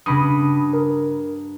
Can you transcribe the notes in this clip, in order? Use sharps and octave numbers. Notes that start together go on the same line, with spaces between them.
G2 C#3 B5 D#6
A#4